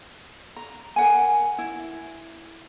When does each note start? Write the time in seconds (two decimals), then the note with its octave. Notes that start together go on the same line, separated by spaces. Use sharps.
0.57 A#5
0.96 A#4 F#5 G#5
1.58 E4